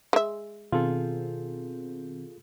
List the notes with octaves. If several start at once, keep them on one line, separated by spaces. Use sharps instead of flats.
G#3 E5
B2 D#3 C4 F4 G#4 A4